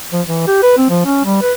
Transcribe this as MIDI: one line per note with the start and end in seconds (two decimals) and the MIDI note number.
0.13 0.22 53
0.27 0.43 52
0.47 0.59 67
0.62 0.73 71
0.78 0.87 60
0.90 1.03 53
1.06 1.20 61
1.24 1.41 55
1.42 1.53 71